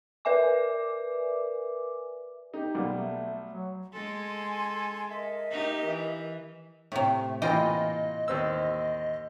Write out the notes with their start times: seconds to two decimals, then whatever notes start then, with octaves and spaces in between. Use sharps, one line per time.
0.25 A#4 B4 D5 E5 G#5 D6
2.54 D#4 G4
2.75 B1 G3 A#3
2.92 A3
3.50 F#3
3.93 G#3 A4 G#5 C6
5.09 A#4 D#5 E5
5.51 D#4 G4
5.87 E3
6.92 A2 C3 A3
7.42 A#2 E3 F4 D#5 G5
8.28 D#2 C4 E6